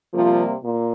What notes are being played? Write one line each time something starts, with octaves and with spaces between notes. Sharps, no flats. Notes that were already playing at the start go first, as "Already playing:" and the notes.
C3 F3 G3 A#3 F4
A#2